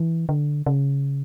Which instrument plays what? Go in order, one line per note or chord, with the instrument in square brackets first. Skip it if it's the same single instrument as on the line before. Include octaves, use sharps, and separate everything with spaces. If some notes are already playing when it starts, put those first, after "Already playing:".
Already playing: [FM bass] E3
D3
C#3